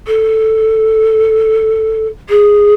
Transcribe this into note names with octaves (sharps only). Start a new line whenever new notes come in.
A4
G#4